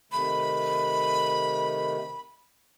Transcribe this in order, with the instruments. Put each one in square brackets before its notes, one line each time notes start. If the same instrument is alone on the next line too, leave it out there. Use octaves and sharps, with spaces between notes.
[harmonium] C3 D#3 A3 [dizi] B5